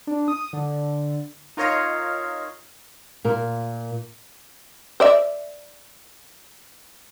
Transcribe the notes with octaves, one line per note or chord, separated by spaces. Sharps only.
D4
D#6
D3
D#4 F4 A#4 C#5 D#5 F5
A#2 A#4
C5 D5 E5